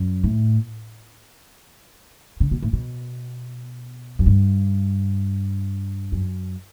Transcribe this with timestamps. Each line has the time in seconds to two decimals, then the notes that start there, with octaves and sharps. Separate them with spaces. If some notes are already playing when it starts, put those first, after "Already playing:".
Already playing: F#2
0.24 A2
2.40 C#3
2.51 B2
2.62 A2
2.73 B2
4.19 F#2
4.26 G2
6.12 F#2